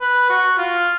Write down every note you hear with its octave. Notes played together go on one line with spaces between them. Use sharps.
B4
F#4
F4